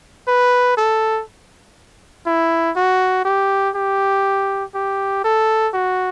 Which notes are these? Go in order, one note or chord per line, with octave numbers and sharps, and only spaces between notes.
B4
A4
E4
F#4
G4
G4
G4
A4
F#4